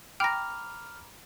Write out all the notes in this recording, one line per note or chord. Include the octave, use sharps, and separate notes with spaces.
G5 A#5 B5 D6 F6 A#6